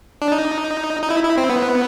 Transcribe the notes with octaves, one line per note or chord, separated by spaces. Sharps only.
D4
D#4
D#4
E4
E4
C4
B3